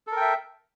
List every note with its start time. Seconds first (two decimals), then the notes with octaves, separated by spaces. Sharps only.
0.07 A4
0.12 A#4
0.17 G5
0.21 E5